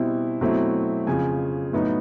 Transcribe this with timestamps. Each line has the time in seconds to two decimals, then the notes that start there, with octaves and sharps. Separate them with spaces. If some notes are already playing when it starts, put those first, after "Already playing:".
Already playing: B2 G3 C4 E4
0.41 B2 F#3 A3 C4 E4
1.07 F2 C#3 F3 G#5
1.73 A2 F#3 B3 D#4